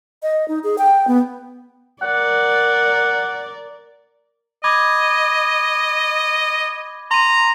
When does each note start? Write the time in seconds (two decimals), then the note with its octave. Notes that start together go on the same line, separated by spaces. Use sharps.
0.23 D#5
0.48 D#4
0.64 G#4
0.78 G5
1.07 B3
2.02 A#4 D5 F#5
4.64 D#5 B5 D6 G#6
7.11 A#5 C6 D#7